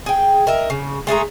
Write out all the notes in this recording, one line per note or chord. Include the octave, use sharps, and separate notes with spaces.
G#4 G5
A#4 D#5 E5
C#3
G#3 A3 G#4 A#5